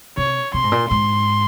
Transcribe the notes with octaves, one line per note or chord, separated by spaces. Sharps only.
C3 C#5
C3 C6
G#2
A#2
G#2 C6